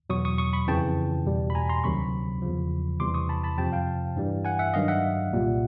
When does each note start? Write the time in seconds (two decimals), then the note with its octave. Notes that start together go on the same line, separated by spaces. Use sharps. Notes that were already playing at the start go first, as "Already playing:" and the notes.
0.10 E2 B2 F#3 C#6 D#6
0.25 C#6 D#6
0.38 C#6 D#6
0.53 B5 C#6
0.68 F2 C#3 E3 G5 A5
1.26 E2 B2 G3
1.50 B5
1.55 G#5 A#5
1.69 A#5 C6
1.84 D2 C3 D#3 F#3 B5 C#6
2.42 E2 C#3 F3
3.00 E2 C3 E3 G3 C6 D6
3.14 C#6 D#6
3.29 A5 B5
3.44 A5 B5
3.58 F2 C3 F3 G5 A5
3.72 F5 G5
4.16 G2 E3 G3
4.45 F#5 G#5
4.59 E5 F#5
4.74 G2 D#3 F#3 D#5 F5
4.88 E5 F#5
5.32 C2 A#2 G3